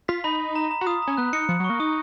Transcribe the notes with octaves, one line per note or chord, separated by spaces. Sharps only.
F4 B6
D#4 B5
B5
A#5
A#5
F#4
F4 D#6
A#5
C#4
B3 F#6
D#4 C#7
F3 C#7
F#3
C#6
A#3
D#4 D#6